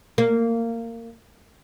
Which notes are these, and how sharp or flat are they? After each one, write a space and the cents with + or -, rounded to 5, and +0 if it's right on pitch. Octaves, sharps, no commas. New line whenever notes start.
A#3 -20